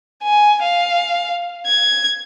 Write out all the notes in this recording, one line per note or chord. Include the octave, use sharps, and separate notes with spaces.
G#5
F5
G#6